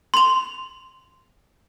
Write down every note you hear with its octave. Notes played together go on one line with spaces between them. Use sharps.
C6 F7